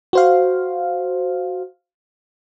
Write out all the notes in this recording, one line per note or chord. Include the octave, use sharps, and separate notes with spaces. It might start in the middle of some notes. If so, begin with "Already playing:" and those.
F#4 C5 F5